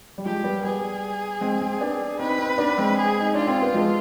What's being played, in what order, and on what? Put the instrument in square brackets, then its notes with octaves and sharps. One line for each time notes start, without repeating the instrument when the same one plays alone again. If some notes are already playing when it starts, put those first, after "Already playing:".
[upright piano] G3
[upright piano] F3 G#3 [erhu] G4
[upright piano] G3 B3
[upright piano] G3 B3 [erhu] G#4
[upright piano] G#3 C4
G#3 C4
B3 D4
[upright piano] C4 D#4 [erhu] B4
[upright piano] C4 D#4
B3 D4
G#3 C4
[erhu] G#4
[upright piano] D#4
[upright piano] D4 [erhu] F4
[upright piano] C4
B3
F3 G#3